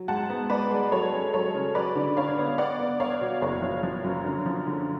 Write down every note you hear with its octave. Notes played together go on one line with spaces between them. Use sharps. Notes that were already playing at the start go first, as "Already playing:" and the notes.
Already playing: F#3
G#2 F#5 A5
B3
B3 B4 D5
G#3
F#3 A4 C#5
C#4
F#3 A4 C#5
C#3
F#3 B4 D5
D3
D3 C#5 F5
B3
B3 D5 F#5
B3
B3 C#5 F5
B2
F#1 C#5 F5
F3
F3
F#2
D3
F3
D3